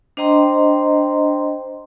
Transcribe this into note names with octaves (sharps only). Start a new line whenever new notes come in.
D4 C5 D#5 G5 A#5 C6